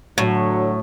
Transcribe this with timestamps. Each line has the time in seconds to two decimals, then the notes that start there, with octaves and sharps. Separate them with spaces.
0.18 A2 D3 F#3